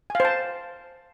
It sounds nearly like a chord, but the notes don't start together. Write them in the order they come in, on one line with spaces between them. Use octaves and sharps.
G#5 F5 C5 A5